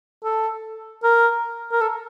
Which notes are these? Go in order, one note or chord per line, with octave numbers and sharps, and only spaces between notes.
A4
A#4
A#4
A4